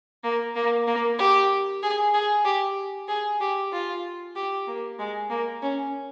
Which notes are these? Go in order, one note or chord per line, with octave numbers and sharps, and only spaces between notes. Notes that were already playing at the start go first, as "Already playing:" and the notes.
A#3
A#3
A#3
G4
G#4
G#4
G4
G#4
G4
F4
G4
A#3
G#3
A#3
C#4